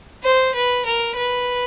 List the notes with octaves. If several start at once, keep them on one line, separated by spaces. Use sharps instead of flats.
C5
B4
A#4
B4